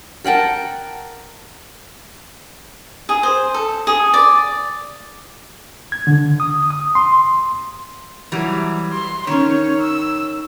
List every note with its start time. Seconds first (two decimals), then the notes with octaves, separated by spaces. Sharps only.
0.25 A#4 F#5 G5 A5
3.09 G#4
3.23 C5
3.54 A4
3.87 G#4
4.14 D5
5.92 G#6
6.07 D3
6.40 D#6
6.71 D#6
6.95 C6
8.32 E3 F#3 G3
8.93 C6
9.27 D#3 C#4 C#5
9.81 E6